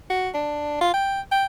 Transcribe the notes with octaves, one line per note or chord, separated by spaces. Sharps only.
F#4
D4
F4
G5
G5